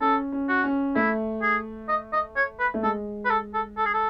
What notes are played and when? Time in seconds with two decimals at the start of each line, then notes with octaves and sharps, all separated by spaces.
0.01 C#4 A4
0.32 C#4
0.49 F#4
0.64 C#4
0.95 A3 E4
1.42 G#4
1.89 D#5
2.13 D#5
2.36 C#5
2.59 B4
2.74 A3
2.83 G#3 A4
3.25 B4
3.30 A4
3.54 A4
3.77 A4
3.85 G#4
3.94 A4